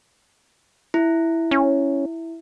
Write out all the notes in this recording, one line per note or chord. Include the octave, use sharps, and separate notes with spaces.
E4
C#4